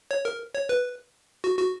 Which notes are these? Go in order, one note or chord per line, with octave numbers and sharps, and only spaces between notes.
C#5
A#4
C#5
B4
F#4
F#4